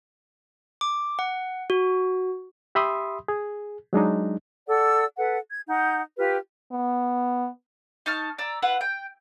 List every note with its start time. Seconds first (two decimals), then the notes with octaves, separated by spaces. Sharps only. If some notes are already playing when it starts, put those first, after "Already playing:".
0.81 D6
1.19 F#5
1.70 F#4
2.75 G4 E5 B5 C6 D#6
3.28 G#4
3.93 F#3 G#3 D4 D#4
4.68 A4 D5 F#5 E6
5.18 A4 B4 F#5
5.50 G#6
5.68 D#4 F#5 G6
6.18 F4 G4 B4 F6
6.72 B3
8.06 D#4 A5 C#6 F6
8.38 D5 A#5 E6
8.62 E4 F4 B4 F#5
8.81 G5